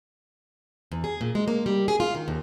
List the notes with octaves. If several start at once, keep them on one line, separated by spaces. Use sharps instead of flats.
E2
G#4
A#2
G#3
A#3
G3
G#4
F4
D#3
D#2